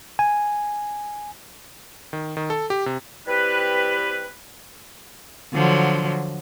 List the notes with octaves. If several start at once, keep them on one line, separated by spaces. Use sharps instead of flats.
G#5
D#3
D#3
A4
G4
C3
G3 C4 E4 G4 B4
D3 F3 F#3